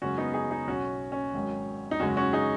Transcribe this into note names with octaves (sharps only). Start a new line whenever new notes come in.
F#2 C#3 G#3 C#4 F#4
B3 D#4
D#4 G#4
D#4 G#4
B1 B2 F#3 C#4 F#4
C#4
G#1 G#2 D#3 F#3
D#4
F#2 C#3 G#3 C#4 F#4
C#4 F#4
D#4 G#4